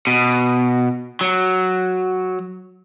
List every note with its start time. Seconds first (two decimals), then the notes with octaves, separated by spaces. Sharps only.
0.07 B2
1.21 F#3